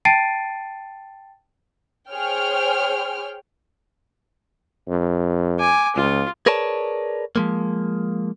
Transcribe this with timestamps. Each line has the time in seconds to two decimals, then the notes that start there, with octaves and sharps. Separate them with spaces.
0.05 G5 A5 A6 C7 D7 D#7
2.11 G#4 C5 C#5 G5 F6
4.88 F2
5.59 G#5 D6
5.96 C#2 F4
6.46 G#4 A#4 B4 C#5 D5 A5
7.36 F3 G#3 A#3